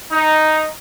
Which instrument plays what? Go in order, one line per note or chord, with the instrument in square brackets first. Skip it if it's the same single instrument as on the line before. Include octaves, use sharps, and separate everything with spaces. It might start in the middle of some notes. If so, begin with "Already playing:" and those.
[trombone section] D#4